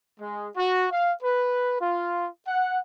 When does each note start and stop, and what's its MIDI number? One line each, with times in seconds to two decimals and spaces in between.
0.19 0.47 56
0.56 0.86 66
0.91 1.12 77
1.23 1.76 71
1.81 2.27 65
2.47 2.78 78